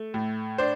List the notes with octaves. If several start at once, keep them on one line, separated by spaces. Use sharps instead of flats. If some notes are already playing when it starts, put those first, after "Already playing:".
Already playing: A3
A2
D4 C5